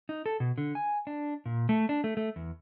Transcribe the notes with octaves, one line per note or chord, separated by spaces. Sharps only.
D#4
A4
B2
D3
G#5
D4
A#2
A3
D4
A3
A3
E2